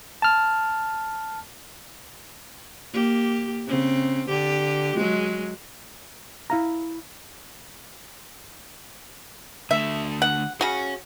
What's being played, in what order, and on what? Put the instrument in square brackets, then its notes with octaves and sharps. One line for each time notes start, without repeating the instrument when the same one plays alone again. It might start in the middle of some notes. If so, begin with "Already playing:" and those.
[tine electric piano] A5 F6
[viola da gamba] A#3 G4
C#3 C4
D3 G4
F#3 G#3
[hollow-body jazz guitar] E4 F5 A#5
[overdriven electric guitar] D3 A3 [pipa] E5
[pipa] F#5
[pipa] C#3 F#4 [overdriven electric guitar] C#5 G#5